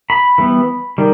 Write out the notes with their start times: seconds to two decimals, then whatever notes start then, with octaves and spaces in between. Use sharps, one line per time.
0.10 B5
0.38 E3 G3 B3
0.98 D#3 G3